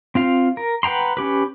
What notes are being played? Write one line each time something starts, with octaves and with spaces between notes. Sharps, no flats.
C4 F4 F5
A#4
B4 F#5 G5 A#5 C6
C#4 G4 B4